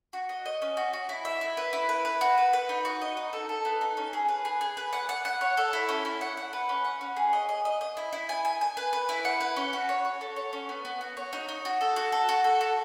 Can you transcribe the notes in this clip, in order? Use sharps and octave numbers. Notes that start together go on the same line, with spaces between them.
F#4
D#5
D#5
C#4
F#4
F#4
E4
E5
E4
B4
E4
B4
B4
F#4
B4
B4
D#4
F#4
D#5
D#4
A4
A4
B3
D#4
C#4
G#4
B4
G#4
G#4
B4
F#5
F#5
F#5
C#5
A4
E4
C#4
E4
F#5
F#5
B4
C#4
F#5
C#4
G#4
D#5
D#5
D#5
D#5
E4
E4
G#5
G#5
G#5
B4
B4
E4
F#5
B4
C#4
F#4
C#5
C#5
A4
C#5
C#4
B3
B3
F#4
C#5
D#4
D#4
F#4
A4
F#4
A4
F#4
A4
F#4